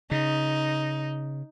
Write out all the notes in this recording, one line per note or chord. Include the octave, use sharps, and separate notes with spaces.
C#3 D#4